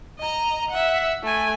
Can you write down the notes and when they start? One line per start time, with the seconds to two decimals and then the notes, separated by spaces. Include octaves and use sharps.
0.19 D#5 A#5
0.70 E5 F#5
1.23 A3 G#5